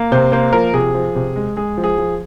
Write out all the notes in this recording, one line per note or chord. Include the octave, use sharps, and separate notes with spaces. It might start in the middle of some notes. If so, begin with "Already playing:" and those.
Already playing: A#3
C3 C5
A#3 C5
F3 A#4
C3 G#4
F3
C3
G#3
G#3 G#4
F3
G#4
F3